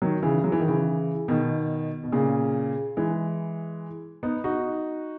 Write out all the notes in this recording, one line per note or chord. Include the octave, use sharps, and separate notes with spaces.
D#3 F#3
C#3 E3
F#3
E3
D#3
C#3 E3
B2 D#3
B2
A#2 C#3
E3 G#3
B3 D#4
D#4 F#4